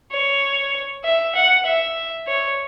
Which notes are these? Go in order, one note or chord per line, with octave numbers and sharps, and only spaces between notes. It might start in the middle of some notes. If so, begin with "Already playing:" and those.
C#5
E5
F#5
E5
C#5